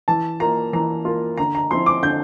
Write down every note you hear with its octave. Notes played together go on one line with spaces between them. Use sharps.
E3 A5
A#3 F4 A#5
E3 A#5
A#3 F4
D3 A#5
A#5
F3 C4 E4 C6
D6
D3 G6